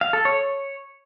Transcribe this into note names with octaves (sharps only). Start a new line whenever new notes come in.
F5
A4
C#5